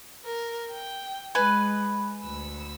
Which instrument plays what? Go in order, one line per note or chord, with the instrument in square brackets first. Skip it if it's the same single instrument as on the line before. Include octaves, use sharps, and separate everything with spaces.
[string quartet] A#4
G5
[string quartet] G#3 [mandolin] B4 G#5
[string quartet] D2 E6